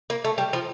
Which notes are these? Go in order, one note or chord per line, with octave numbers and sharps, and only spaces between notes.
A#3
A3
G3
F3